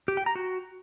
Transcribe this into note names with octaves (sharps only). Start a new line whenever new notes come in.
G4
G5
A#5
F#4